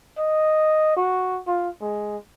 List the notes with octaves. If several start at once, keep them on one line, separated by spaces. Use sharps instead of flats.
D#5
F#4
F4
G#3